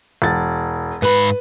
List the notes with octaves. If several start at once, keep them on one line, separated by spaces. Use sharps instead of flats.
E1 A6
G#2 B4 B5